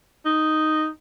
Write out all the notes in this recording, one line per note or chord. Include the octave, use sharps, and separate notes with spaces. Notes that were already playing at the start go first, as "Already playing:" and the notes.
D#4